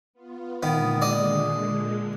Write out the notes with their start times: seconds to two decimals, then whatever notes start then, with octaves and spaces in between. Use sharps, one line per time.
0.13 B3 F4
0.63 A#2 D3 D#3 G#3 B3
1.02 D5 D#5 D#6